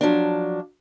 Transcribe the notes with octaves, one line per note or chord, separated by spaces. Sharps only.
F3 F#3 D4